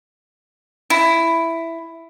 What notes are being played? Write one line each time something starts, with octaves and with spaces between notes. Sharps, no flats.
E4